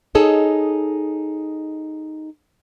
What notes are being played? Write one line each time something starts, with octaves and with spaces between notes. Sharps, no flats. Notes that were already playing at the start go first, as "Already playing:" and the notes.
D#4 G#4 A4 C#5 D#5